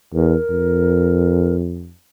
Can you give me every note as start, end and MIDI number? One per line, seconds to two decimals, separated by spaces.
0.14 0.36 40
0.14 1.55 70
0.50 1.94 41